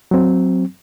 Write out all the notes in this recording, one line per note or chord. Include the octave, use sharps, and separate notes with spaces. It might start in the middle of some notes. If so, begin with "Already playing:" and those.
F#3 C4